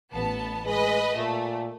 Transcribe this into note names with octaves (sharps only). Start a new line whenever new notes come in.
A1 B3 A5
G#3 B4 D#5
A#2 A3